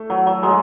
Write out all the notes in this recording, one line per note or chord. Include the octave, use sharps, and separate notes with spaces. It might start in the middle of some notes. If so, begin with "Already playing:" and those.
Already playing: A3
F#3
F#3
F#3 G#3